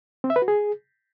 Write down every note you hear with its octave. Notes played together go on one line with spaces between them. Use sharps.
C4
E5
B4
F#4
G#4